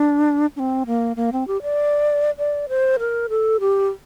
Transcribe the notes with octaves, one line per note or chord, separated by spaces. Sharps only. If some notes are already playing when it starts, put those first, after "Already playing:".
Already playing: D4
D4
C4
A#3
A#3
C4
G4
D5
D5
C5
A#4
A4
G4